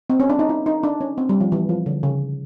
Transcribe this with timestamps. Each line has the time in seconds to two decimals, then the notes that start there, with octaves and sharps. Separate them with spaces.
0.10 C4
0.20 C#4
0.29 D4
0.39 D#4
0.49 E4
0.66 D#4
0.83 D4
1.01 C#4
1.18 C4
1.29 G3
1.40 F3
1.52 E3
1.69 F3
1.86 D3
2.03 C#3